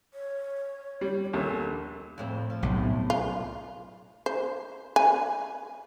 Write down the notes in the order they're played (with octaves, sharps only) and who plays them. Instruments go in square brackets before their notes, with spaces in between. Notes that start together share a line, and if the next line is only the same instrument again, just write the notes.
[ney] C#5
[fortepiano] G3
[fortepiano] A#1 D#2 [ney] A4
[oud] F2 A2 C4
F3
[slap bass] B1 [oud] F#2 A2 C3
[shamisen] F4
C5
G#5